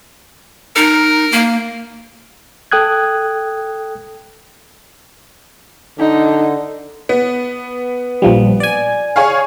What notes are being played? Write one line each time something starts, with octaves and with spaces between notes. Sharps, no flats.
D#4 A#4
A#3
A4 G5 D#6 F#6 G#6
D3 D#4
B3
A#1 F3 G3
D5 G#5
G#4 C#5 F5